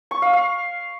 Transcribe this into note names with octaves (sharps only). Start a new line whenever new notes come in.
C#6
F5
F5